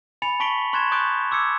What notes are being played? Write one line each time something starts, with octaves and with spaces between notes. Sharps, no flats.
G#5 B5 A6 C#7 F7
A5 C#6 B6 D7 F#7 G7
C6 C#6 F#6 G#6 A6 E7
C#6 D#6 F#6 G6 A6 D7
D6 E6 G#6 C#7